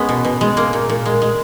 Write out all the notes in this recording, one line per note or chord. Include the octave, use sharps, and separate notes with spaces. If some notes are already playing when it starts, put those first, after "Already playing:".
Already playing: G#3 B3 C#4
B2
B2
G#3
G#3 A#3
A#2
A#2
G#3
G#3